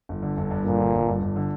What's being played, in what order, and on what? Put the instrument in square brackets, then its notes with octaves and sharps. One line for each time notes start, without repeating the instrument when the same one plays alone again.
[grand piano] G1
D3
G1
G2
[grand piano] G1 [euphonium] A#2
[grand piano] D3
G1
G2
G1
D3